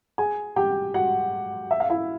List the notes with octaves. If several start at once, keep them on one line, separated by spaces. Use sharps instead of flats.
G#4 G#5
G4 G5
F#4 F#5
E5
F5
E4 E5